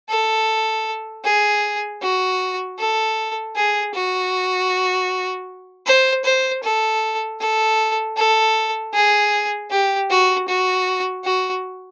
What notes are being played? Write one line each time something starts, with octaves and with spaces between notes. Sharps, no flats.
A4
G#4
F#4
A4
G#4
F#4
C5
C5
A4
A4
A4
G#4
G4
F#4
F#4
F#4